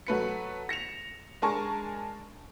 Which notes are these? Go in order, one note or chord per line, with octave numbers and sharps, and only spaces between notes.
F#3 A3 B4 C#7
A#6 C#7 E7 F7
G#3 D4 A#4 G#5 A5 C#6